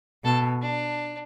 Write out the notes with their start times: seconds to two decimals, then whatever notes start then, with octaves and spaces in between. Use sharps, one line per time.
0.24 B2 A4
0.62 D4